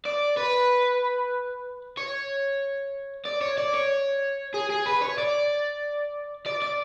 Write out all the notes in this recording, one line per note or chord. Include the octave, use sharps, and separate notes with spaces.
D5
B4
C#5
D5
C#5
D5
C#5
G#4
G#4
B4
C#5
D5
D5
D5